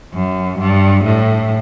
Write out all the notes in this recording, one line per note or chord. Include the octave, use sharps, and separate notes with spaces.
F#2
G2
A2